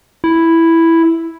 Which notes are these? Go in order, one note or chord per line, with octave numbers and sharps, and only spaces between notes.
E4